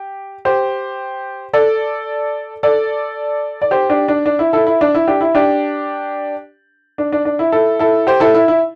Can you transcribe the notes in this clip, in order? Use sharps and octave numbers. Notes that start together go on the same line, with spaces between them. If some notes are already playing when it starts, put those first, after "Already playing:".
Already playing: G4
G4 C5
A4 D5
A4 D5
D5
G4 C5
D4 G4
D4
D4
E4
E4 A4
E4
D4
E4
D4 G4
E4
D4 G4
D4
D4
D4
E4
E4 A4
E4 A4
G4 C5
E4 A4
E4
E4